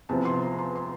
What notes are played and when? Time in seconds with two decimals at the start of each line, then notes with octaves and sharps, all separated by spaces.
0.09 E2 C3 F3 C4 A5
0.25 C6
0.42 A#5
0.59 C6
0.75 C6